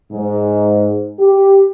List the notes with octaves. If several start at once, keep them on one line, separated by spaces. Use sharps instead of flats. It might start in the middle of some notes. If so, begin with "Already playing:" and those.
G#2
G4